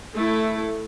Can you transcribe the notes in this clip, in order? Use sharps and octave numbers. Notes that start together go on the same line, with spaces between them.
A3 E4 A4